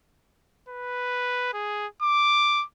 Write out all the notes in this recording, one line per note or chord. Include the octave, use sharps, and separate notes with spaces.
B4
G#4
D6